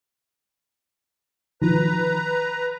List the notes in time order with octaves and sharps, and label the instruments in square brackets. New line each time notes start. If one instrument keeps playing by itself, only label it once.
[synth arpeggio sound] D#3 F3 [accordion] B4 A#5